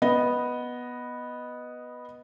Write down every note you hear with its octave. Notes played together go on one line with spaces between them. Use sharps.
B3 D#5